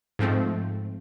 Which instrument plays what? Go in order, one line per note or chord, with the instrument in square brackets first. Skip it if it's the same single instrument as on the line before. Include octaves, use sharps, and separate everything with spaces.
[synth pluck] G#2 F3 A3 C4